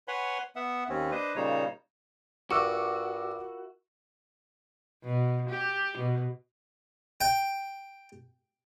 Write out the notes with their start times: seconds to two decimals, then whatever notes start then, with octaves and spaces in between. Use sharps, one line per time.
0.08 B4 C#5 F#5 G#5 B5 C6
0.56 B3 E5 F#5
0.89 D#2 C4 C#4
1.11 D4 B4 C5 D#5
1.36 A#2 C#3 G3 D#4 C5 C#5
2.51 G2 F4 F#4 A#4 E5 C#6 D6 E6
5.04 B2
5.49 G4
5.98 B2
7.21 G5